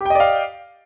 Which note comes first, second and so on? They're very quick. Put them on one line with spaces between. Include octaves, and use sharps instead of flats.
G4 G5 D#5 D5 F5